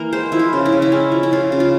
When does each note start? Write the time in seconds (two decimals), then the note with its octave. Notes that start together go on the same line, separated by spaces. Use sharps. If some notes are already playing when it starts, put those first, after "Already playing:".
Already playing: E3 A#3 A#4
0.13 G#3 C5
0.32 F3 E4
0.39 F4
0.53 C#3
0.66 E4
0.72 C#3
0.82 E4
0.92 G#3 C#4
1.12 F3
1.23 E4
1.32 C#3 F4
1.52 C#3
1.60 F4